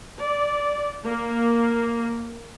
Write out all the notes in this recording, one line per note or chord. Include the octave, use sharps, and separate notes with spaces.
D5
A#3